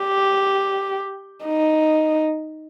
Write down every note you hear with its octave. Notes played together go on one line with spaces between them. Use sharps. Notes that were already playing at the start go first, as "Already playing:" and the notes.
Already playing: G4
D#4